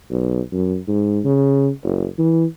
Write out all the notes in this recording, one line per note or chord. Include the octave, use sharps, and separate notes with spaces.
B1
F#2
G#2
C#3
F#1
E3